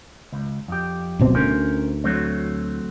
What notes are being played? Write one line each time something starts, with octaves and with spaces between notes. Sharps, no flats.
C#2
F2 G4
D1 B2 C4
D2 C#4 A#4 C5
F#3 A3 C4